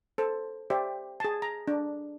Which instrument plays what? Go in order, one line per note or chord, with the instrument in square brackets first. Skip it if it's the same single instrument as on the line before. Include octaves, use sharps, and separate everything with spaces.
[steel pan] A4 C5
G4 C5 D5 E5
G#4 A5
A#5
D4